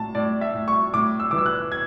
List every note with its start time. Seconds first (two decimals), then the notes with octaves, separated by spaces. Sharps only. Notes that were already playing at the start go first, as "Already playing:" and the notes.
Already playing: A2 A5
0.15 A2 D5
0.41 E5
0.54 A2
0.68 C#6
0.94 A2 D6
1.20 E6
1.31 E3 D6
1.38 E6
1.46 F#6
1.72 G#6